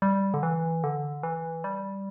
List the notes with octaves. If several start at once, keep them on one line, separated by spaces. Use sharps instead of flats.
G3
D3
E3
D3
E3
G3